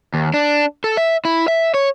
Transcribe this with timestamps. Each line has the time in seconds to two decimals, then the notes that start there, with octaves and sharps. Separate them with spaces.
0.14 D#2
0.34 D4
0.84 A4
0.97 E5
1.25 E4
1.48 E5
1.74 C#5